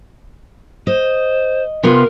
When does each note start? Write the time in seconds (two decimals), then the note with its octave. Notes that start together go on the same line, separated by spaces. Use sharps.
0.87 C5 D#5
1.83 C3 B3 F4 A#4